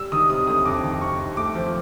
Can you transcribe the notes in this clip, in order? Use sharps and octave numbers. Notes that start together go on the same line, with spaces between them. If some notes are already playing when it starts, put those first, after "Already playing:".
Already playing: G3 E6
D#3 D#6
C3 D#6
D2 D#6
F2 D6
D#3
C3 C#6
F2
A3 D6
F3